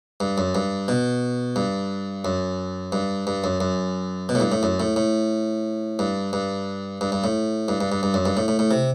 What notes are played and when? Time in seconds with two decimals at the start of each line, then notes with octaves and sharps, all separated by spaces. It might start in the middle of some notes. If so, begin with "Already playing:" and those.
0.20 G2
0.38 F#2
0.55 G2
0.88 B2
1.56 G2
2.25 F#2
2.92 G2
3.27 G2
3.44 F#2
3.60 F#2
4.29 B2
4.35 A2
4.40 G2
4.52 A2
4.63 F#2
4.80 A2
4.96 A2
5.99 G2
6.33 G2
7.01 G2
7.12 G2
7.24 A2
7.68 G2
7.81 G2
7.92 G2
8.03 G2
8.14 F#2
8.26 G2
8.37 A2
8.48 A2
8.59 A2
8.71 C3